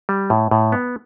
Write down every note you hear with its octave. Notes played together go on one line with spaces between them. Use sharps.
G3
A2
A2
B3